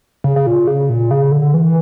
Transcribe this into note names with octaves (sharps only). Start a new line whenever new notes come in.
C#3
C#3
A#2
C#3
A#2
C#3
D3
E3